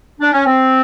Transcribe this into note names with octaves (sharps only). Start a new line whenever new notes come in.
D4
C#4
C4